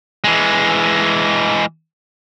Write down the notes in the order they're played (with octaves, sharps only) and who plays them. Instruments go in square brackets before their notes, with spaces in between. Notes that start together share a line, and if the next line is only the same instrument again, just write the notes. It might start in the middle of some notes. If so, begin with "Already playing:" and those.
[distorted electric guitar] E3 G#3